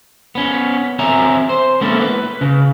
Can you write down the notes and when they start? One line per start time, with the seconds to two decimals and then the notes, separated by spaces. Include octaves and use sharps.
0.35 B3 C#4
0.99 C4 C#5 E5 G#5 A#5
1.49 C5
1.81 G#3 A#3 B3 C#4 E4 A4
2.01 B4
2.41 C#3